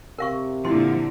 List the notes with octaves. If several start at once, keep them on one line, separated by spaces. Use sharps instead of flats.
C3 A#4 F5 C#6
A#2 D3 F3 E4 C6